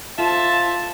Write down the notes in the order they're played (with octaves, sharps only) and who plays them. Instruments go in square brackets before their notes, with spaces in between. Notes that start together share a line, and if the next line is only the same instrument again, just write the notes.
[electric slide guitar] F4 [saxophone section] A4 C5 E5 [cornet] A5